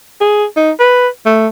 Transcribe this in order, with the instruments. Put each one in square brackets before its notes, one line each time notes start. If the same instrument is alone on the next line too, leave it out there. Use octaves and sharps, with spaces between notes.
[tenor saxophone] G#4
D#4
B4
A3